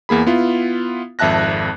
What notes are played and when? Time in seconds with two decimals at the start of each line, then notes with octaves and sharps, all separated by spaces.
0.09 E2 A#3 G#4 B5
0.27 B3 E4 F4
1.19 G#1 F2 E5 A5 F#6 A#6